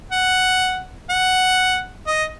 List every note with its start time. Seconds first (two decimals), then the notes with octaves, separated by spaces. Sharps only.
0.12 F#5
1.10 F#5
2.07 D#5